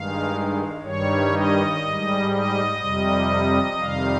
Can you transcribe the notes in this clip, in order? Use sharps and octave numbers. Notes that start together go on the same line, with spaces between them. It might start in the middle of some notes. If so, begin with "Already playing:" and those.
Already playing: G2 D#3 G#3 F5
G2 D#3 G3 C#5
D#5
G#2 G3
D#5
F2 C3 G3
F2 C3 D#3 G3 F5